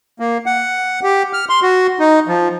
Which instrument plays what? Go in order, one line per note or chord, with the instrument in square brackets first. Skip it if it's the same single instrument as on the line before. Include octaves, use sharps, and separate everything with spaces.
[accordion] A#3
F#5
G4
F6
C6
F#4
D#4
F3